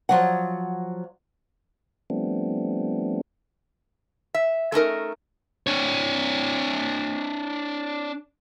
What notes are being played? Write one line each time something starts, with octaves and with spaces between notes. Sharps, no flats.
F3 F#3 F#5
F3 G3 A3 B3 C4 D4
E5
A3 C#4 D#4 A#4
D4 C#5